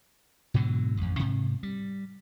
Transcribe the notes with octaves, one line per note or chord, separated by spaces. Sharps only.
G#2 B2 D3 F#3
A1 F2
G#2 C3
G3